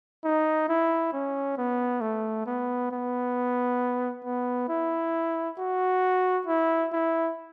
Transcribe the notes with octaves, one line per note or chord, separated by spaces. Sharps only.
D#4
E4
C#4
B3
A3
B3
B3
B3
E4
F#4
E4
E4